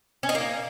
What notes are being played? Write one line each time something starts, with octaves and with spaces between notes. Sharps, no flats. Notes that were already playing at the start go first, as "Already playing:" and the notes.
C#4
D#4
A#3